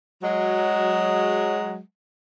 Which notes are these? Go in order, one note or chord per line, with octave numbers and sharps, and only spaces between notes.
F#3 G#3